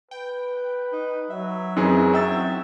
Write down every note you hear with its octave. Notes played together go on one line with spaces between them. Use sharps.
B4 G5
D#4
F#3 E5
F#2 E3 C4 D#4 G#4
E5 G5 E6 A6